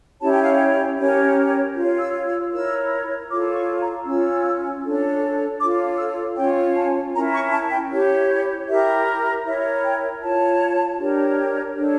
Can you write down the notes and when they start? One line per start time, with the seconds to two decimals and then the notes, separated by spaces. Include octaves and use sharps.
0.20 C#4 E4 G4 C#5 A5
0.32 G5
0.42 F5
0.54 G5
0.97 C#4 G4 A#4 C#5
1.75 F4 C#5
2.00 E6
2.26 E6
2.51 E4 A#4 C#5 E6
3.29 F4 A4 C#5 D6
3.54 C#6
3.80 A#5
4.05 C#4 F4 C#5 E6
4.83 D4 A4 C#5
5.59 F4 A4 C#5 D6
5.98 E6
6.36 C#4 F4 C#5 G5
6.76 A5
7.13 C#4 E4 A#4 A#5
7.33 C#6
7.52 A5
7.71 G5
7.90 E4 G4 C#5
8.68 E4 G4 A#4 E5
9.44 E4 A#4 C#5 E5
9.84 G5
10.21 F4 C#5 A5
10.99 D4 G4 A#4 C#5
11.75 D4 A4 C#5